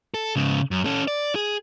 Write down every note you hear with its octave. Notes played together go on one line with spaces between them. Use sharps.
A4
G#2 C#3
F#2
C#4 A4
D5
G#4